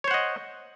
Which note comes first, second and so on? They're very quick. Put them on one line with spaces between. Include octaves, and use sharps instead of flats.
C#5 C5 F#5 D#5